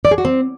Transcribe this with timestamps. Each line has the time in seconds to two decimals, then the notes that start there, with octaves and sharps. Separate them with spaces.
0.05 D5
0.11 G#4
0.18 F#4
0.25 C4